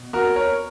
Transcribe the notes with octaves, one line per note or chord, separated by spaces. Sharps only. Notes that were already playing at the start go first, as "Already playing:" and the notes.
Already playing: B2
F#4 A#4
A#4 C#5